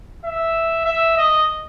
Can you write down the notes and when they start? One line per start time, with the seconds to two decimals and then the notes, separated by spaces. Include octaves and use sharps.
0.25 E5
0.85 E5
1.17 D#5